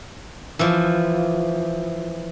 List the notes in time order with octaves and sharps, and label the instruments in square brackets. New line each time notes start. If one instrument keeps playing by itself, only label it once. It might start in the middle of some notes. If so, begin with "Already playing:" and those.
[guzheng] E3 F3